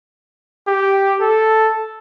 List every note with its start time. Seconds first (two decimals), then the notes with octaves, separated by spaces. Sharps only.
0.67 G4
1.20 A4